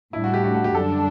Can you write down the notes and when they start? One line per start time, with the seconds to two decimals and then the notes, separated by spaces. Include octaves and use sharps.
0.13 A2 G3 D4 E4
0.24 F#4
0.34 G4
0.44 F#4
0.54 F#4
0.64 G4
0.75 F#2 D3 G3 D4 A4